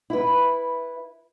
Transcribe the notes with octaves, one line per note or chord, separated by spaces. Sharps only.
E4 B4